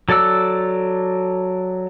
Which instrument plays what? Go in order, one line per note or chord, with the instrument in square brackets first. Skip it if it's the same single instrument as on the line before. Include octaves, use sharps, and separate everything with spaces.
[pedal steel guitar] F#3 A4 D5 F#5 E6